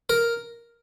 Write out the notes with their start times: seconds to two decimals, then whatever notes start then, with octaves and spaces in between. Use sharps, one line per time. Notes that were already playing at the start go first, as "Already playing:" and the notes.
0.10 A#4